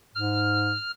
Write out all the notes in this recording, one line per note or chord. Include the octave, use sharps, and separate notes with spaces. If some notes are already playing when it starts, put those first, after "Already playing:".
G#2 F6